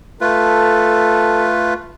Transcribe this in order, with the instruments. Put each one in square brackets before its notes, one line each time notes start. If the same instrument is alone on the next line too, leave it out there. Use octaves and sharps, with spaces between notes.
[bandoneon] A3 F4 B4 [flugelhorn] A4